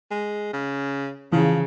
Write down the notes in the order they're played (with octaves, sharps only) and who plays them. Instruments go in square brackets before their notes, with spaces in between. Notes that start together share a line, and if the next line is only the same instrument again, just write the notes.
[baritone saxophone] G#3
C#3
[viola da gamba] C#3 [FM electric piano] E3 [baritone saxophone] F3